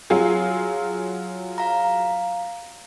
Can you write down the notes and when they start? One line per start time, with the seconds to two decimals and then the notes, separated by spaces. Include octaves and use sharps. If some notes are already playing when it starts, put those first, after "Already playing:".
0.10 F#3 F4 G#4
1.58 F5 A#5